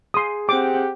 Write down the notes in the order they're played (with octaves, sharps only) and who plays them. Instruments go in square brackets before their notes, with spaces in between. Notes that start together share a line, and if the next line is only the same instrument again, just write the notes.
[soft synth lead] G#4 [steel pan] C6 D#6
[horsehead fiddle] C4 F#5 [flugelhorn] G4 [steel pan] D6